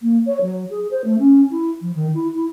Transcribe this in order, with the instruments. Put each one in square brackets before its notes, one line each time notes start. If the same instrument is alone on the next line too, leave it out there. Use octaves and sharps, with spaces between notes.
[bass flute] A#3
C#5
F#3
G#4
C5
A3
C#4
E4
F3
D#3
E4
E4